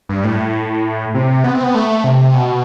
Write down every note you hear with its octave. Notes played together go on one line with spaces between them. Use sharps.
G2
A2
C3
B3
C4
B3
A3
C3
B2